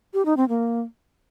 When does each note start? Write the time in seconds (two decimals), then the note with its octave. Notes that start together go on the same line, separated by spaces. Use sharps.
0.14 G4
0.25 D#4
0.37 C4
0.49 A#3